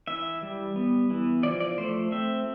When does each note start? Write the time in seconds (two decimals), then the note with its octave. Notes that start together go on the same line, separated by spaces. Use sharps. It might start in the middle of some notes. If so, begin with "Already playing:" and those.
0.07 E3 E5
0.42 G3
0.76 B3
1.10 E3
1.43 F3 D5
1.60 D5
1.78 A3 C5
2.12 C4 E5